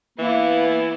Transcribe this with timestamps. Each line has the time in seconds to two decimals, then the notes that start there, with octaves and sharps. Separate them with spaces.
0.18 E3 A#3 B3 E4